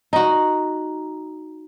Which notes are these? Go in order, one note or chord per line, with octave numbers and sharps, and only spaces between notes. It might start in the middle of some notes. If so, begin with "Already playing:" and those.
D#4 F#4 A#5